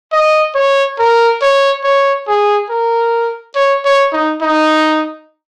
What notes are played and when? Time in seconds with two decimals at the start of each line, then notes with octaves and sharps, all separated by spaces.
0.13 D#5
0.55 C#5
0.99 A#4
1.42 C#5
1.84 C#5
2.27 G#4
2.70 A#4
3.56 C#5
3.85 C#5
4.12 D#4
4.42 D#4